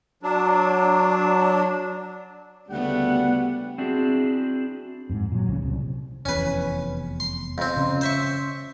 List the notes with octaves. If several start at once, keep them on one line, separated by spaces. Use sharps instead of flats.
F#3 D4
D2 C#3 G3 A3 B3 F#5
C4 D4 E4 F#4 G#4
F2 G#2
A#2 F#3
F1 C2 C#3
C2
F1 E2 C#4 B4
C6
F2 C4
C#3 C#4
C5 E5 C#6